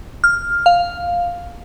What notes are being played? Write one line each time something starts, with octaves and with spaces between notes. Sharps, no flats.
F6
F5